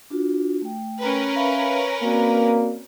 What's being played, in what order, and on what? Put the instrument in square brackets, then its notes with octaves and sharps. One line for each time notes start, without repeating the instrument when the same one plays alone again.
[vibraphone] D4 F4 F#4
A3 G5
[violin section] C#4 A#4 B4
[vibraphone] E5 F5 B5
[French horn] A#3 [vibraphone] C4 F#4 D5